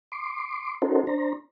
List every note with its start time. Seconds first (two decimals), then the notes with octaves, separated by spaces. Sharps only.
0.12 C6 D6
0.82 C#4 D#4 F#4 A4 A#4 C5
1.07 D4 C5 A#5